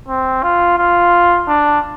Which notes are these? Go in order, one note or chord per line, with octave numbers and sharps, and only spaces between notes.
C4
F4
F4
D4